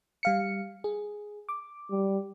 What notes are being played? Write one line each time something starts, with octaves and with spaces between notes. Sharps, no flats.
G3 F5 C#7
G#4
D6
G3